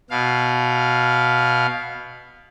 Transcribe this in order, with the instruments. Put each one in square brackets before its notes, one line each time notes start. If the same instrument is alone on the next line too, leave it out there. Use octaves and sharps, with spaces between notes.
[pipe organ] B2 F5